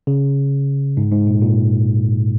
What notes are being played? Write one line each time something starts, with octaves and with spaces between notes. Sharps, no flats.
C#3
G#2
G#2
A#2
A#2